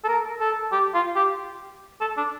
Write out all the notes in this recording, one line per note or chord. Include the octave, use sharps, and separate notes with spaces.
A4
A#4
A4
G4
F4
G4
A4
D4